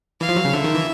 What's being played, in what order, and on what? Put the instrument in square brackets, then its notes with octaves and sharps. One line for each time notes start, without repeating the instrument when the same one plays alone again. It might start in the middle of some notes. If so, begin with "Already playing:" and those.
[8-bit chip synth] E3 [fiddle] F5
[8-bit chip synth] F3
F#3
C#3
[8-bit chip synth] D3 [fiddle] E5
[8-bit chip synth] D#3
E3